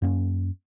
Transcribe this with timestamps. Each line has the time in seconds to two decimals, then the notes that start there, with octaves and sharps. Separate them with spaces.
0.02 F#2 A#3 C#4